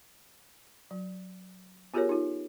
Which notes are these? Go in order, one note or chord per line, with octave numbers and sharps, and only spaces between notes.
F#3
B3 F4 G4 G#4 A#4 C#5
D#4 F4